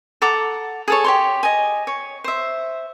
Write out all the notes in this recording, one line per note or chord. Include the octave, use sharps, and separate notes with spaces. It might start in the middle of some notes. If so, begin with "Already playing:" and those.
A4 F#5 A#5 D6
G#4 A4 C#5
G4 C#5 C6
D#5 G#5
C#5
C5 E5